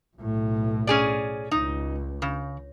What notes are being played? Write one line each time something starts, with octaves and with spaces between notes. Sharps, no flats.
B1 A2
C#4 G#4 D5
C#2 D#4
C#3